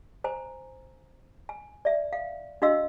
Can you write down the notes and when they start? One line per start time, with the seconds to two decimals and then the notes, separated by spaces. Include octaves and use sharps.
0.24 C5 G#5 A#5
1.49 G#5
1.85 D5 E5
2.13 F5
2.62 D4 F#4 D#5 F5 C6 E6